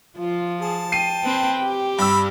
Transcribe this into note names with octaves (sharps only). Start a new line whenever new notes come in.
F3 F4
G#4 A5
G5 C7 D#7
C4 B4
G4
G2 B5 E6